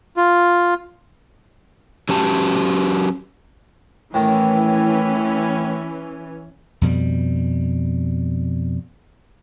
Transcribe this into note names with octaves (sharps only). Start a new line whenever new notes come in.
F4
F#3 C#4 G4 A5
A2 D#3 E3 C#4
F2 B2 G3